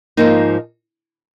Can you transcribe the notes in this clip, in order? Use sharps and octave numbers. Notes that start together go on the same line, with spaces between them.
G#2 F3 A#3 D#4